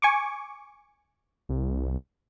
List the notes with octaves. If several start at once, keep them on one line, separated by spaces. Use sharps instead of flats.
G#5 C#6 D6
C2